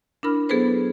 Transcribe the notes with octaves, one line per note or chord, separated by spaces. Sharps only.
D4 E4 A#4 B5 F6
F#3 B3 G#4 A4 B4 C5